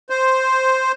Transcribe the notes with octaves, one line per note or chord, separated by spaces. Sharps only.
C5